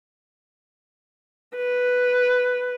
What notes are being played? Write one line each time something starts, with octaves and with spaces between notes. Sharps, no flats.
B4